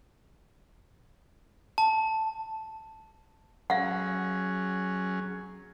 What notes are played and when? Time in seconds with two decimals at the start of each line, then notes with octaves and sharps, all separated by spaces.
1.78 A5
3.70 F#3 C#4 G#4 F5 F#5